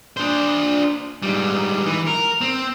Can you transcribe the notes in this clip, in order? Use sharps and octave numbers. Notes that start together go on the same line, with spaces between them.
D4 C5
G#2 G3
E3
A#4
C4